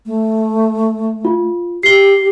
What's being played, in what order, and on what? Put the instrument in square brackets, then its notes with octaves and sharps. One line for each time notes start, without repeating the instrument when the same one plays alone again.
[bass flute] A3
[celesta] F4
[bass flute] G4 [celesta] C7 G7